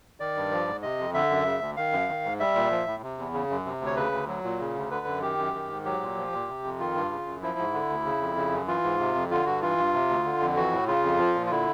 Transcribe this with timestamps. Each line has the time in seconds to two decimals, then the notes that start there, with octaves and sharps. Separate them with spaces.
0.20 D#3 D5
0.36 G2
0.51 F3
0.67 G#2
0.82 C3 D#5
0.99 F2
1.14 D3 E5
1.30 F#2
1.45 C#3
1.61 D2
1.77 D#3 F5
1.92 F#2
2.09 D#3
2.24 G#2
2.40 G3 E5
2.55 A#2
2.71 F3
2.87 A2
3.02 C3
3.18 E2
3.34 C#3
3.50 F#2
3.66 C3
3.81 D2
3.86 C#5
3.96 C#3 B4
4.12 D2
4.28 F#3
4.44 A#2
4.60 C#3
4.75 D2
4.91 D3 B4
5.06 F#2
5.22 D#3 G4
5.38 F#2
5.54 D#3
5.69 G#2
5.85 F#3 G4
6.01 A#2
6.17 F3
6.32 A#2
6.48 C3
6.64 F2
6.79 D#3 F4
6.95 G2
7.10 C#3
7.26 F#2
7.42 F3 E4
7.58 G#2
7.73 D3
7.89 D2
8.05 C#3
8.20 F2
8.37 C#3
8.52 F#2
8.67 E3 F4
8.84 G#2
9.00 C3
9.15 F2
9.31 D3 F4
9.46 G2 F#4
9.62 E3 F4
9.78 G2
9.93 C3
10.09 D2
10.25 D3
10.40 F2
10.56 E3 F#4
10.72 A2
10.87 C#3 F4
11.04 F2
11.19 F3
11.35 A#2
11.46 F4
11.50 D3 E4